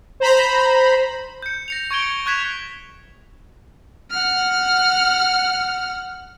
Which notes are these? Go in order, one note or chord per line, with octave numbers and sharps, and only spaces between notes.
C5 A#5 B5
G6 C#7
A#6 C#7 F7
C#6 G#6 D7 G7
C#7
C#6 F#6 G#6 B6 E7 F7
F#5 F6